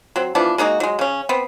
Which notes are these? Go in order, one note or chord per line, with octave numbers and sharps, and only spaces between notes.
F#3 C4
E3 F3 B3 D4
G#3 A#3 D#4 F#4
F#3 G#3
C#3 C#4
B3 C4